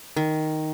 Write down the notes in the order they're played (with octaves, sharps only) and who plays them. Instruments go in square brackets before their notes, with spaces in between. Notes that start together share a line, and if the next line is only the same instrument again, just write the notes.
[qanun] D#3